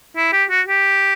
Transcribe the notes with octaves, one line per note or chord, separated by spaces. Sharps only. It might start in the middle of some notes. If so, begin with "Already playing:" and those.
E4
G4
F#4
G4